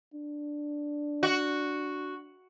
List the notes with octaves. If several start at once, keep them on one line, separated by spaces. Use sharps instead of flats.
D4
F#4